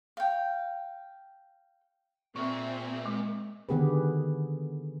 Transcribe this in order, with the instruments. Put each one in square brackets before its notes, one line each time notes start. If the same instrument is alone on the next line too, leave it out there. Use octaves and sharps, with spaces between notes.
[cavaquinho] F5 G5
[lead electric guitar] A#2 [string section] C4 G#4 E5 [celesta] C#6
[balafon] G#3
[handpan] D3 D#3 B3 G4 G#4 B4